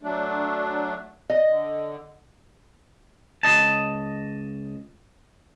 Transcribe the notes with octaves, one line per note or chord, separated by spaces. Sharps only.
F#3 A3 D4
D#5
D3
C#2 D#5 A5